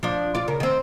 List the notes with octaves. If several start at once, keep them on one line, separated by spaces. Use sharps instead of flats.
F3 D4
F4 D5
C#3 A#4
D#3 C4